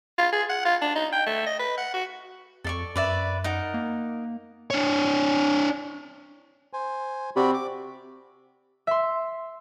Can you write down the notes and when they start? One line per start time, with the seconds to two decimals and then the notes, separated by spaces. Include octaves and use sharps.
0.18 F4
0.32 G#4
0.49 F#5
0.65 F4
0.81 D4
0.95 D#4
1.12 G5
1.26 A3
1.46 D#5
1.59 B4
1.78 F#5
1.94 F#4
2.64 F2 A4 D5 C#6
2.96 F#2 B4 D5 E5
3.44 D#4 A#4 F#5
3.74 A#3
4.71 D4 C#5
6.73 C5 G#5
7.36 C3 F#4 D5 B5
7.54 D6
8.87 E5 C6